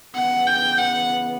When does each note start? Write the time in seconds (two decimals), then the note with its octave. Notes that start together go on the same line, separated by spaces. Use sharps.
0.15 C#3 E3 B3 F#5
0.47 G5
0.78 F#5